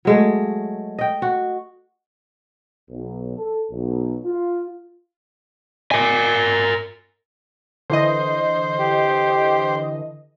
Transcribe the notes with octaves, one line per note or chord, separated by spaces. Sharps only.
F#3 G#3 A3
D#5 G5
F#4
B1
A4
B1
F4
A#4 G#5
D3 E3 C5 D#5
G4